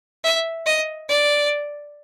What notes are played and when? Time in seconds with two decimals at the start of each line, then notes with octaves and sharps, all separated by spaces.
0.24 E5
0.66 D#5
1.09 D5